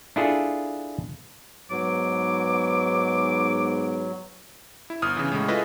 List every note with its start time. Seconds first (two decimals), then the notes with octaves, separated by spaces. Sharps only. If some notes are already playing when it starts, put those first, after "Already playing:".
0.16 D4 E4 F4 G#4 A4
1.71 G#2 F#3 B3 D6
4.90 E4
5.02 G1 D#6 F6
5.16 C#3 E3
5.32 A2 C#3 G#3
5.48 E4 F4 G#4 A4 B4 D#5